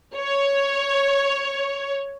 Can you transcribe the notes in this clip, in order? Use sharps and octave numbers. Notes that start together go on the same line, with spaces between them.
C#5